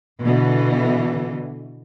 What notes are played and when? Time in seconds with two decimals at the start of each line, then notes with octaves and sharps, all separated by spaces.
0.22 B2 D3 E3